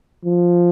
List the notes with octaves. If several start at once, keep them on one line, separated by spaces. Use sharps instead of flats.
F3